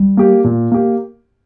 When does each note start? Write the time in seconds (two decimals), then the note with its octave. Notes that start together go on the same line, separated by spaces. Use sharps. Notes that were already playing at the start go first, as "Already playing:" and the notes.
Already playing: G3
0.17 A#3 G4
0.44 A#2
0.72 A#3 G4